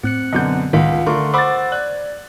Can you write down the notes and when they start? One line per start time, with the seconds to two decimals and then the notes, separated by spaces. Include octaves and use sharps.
0.03 A2 C4 F#6 C#7
0.33 F#2 B2 D3 D#5 G6
0.73 C#2 A2 D#3 F4 F5 F#5
1.07 D3 A3 A#4 C6 C#6
1.34 C5 F#5 B5 D6 E6 A6
1.72 D5 F#6